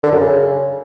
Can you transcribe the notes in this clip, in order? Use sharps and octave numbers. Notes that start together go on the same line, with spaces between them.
D3
F#2
C#3